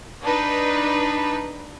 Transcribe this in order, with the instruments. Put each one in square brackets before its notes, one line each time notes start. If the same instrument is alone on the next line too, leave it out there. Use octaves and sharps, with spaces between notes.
[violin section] D4 D#4 B4